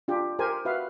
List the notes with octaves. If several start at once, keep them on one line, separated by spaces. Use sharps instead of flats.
D4 F4 G4
G4 A#4 C5 G#5
F#4 B4 E5 F5